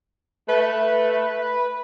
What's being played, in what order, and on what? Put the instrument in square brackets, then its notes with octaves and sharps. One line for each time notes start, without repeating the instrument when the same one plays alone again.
[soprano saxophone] A3 [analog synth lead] B4